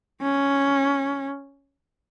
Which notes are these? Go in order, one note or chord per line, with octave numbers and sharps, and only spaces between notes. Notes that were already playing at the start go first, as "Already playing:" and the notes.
C#4